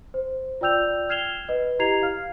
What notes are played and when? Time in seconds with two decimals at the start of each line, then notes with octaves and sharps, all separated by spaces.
0.14 C5
0.61 F4 D5 G5 E6 G6 F7
1.09 F6 G#6 C7 E7 F7 G7
1.49 B4 D#5
1.79 E4 G4 A#5 G#6 C7 F7
2.02 F5 F6